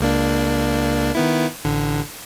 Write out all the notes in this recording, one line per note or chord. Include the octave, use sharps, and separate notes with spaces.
C#2 A#3 D4
D#3 B3 E4
A1 D3